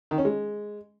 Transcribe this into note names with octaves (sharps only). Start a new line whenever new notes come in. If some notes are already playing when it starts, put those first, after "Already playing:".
D#3
C#4
G#3